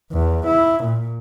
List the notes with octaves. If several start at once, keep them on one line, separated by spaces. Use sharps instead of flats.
E2
E4
A#2